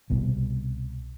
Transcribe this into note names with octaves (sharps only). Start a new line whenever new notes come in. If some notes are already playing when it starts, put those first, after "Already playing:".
C2 B2